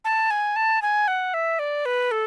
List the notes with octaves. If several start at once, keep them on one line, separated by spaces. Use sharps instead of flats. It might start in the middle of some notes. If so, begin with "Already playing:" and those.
A5
G#5
A5
G#5
F#5
E5
D5
B4
A4